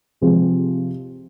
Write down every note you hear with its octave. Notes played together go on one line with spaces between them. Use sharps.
C3 F3 G#3 C4